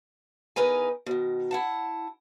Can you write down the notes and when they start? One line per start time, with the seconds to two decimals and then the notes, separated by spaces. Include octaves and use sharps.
0.56 E2 D#4 A#4 B4 G#5
1.06 B2 D#3
1.51 E4 F#5 A5